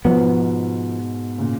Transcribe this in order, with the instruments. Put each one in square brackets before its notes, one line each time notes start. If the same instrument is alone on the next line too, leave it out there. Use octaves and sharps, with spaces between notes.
[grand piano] G#2 B2 [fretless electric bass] F3 B3
[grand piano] A#2 C#3